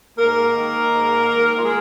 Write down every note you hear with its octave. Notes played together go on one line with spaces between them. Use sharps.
G#2 A#3 A#4
D#3
G#2
D#3
F4
G#3 G#4